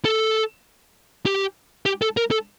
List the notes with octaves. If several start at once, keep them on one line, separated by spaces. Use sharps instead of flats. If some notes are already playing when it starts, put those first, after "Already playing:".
A4
G4
G4
A4
A#4
A4